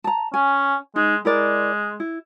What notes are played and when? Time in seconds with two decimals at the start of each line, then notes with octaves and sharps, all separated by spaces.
0.04 A5 A#5
0.34 C#4 G#5
0.96 G#3 D#4
1.25 G#3 E4 A#4 D5
2.00 E4